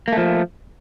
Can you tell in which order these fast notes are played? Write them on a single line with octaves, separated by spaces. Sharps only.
A#3 A3 F3